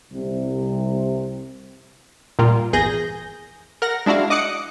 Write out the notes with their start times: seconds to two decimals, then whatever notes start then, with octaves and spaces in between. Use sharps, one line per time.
0.12 C2 C3
2.39 A#2 G3 A#3 F4
2.73 G#1 E2 G#4 G6 A#6
3.82 A#4 F#5 A#6
4.06 G#3 D4 E4 F#4 F5
4.30 D#5 D6 D#6 F#6 C#7